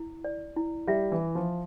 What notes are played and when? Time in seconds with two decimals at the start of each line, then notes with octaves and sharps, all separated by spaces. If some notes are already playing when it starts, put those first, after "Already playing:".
Already playing: E4
0.24 D5
0.56 E4
0.87 G3 E5
1.12 E3
1.19 E5
1.35 F3